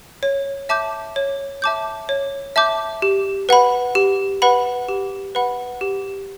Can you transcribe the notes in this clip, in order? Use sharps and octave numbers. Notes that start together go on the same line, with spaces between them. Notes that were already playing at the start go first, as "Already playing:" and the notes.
C#5
E5 A5 D6 G6
C#5
E5 A5 D6 G6
C#5
E5 A5 D6 G6
G4
B4 F#5 B5
G4
B4 F#5 B5
G4
B4 F#5 B5
G4